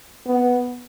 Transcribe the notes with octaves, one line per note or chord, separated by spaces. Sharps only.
B3